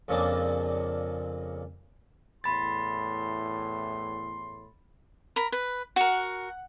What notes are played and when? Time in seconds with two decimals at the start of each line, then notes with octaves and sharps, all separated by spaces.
0.08 F2 A#2 C#3 A#3 C4 D4
2.44 E2 A2 B5 C6 A6
5.36 A#4 B5
5.52 B4
5.96 F#4 A#4 F#5